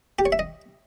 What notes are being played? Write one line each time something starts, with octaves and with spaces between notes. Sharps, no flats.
G4
C#5
E5
D#5